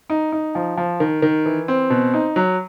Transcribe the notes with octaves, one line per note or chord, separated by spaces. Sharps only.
D#4
D#4
F3
F3
D#3
D#3
E3
C4
B2
D#4
F#3